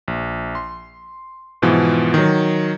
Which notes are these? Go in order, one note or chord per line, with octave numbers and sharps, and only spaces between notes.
A#1
C6
G#2 B2 E3 F3
D#3 F#3